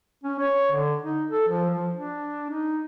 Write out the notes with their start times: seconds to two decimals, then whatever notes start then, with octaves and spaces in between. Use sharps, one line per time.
0.24 C#4
0.39 C#5
0.72 D3
1.03 D#4
1.31 A4
1.49 F3
1.70 F3
1.93 D4
2.50 D#4